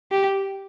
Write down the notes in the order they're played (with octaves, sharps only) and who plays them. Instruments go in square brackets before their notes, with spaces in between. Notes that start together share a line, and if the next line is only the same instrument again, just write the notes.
[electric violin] G4